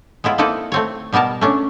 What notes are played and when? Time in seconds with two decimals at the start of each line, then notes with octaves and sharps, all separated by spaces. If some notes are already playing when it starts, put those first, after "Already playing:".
0.24 G#3 B3 E4 F4
0.38 A#3 C4 D#4 E4 A4 B4
0.72 A3 C4 C#5
1.12 B2 G3 B3 A#4 A5
1.41 A3 C#4 D4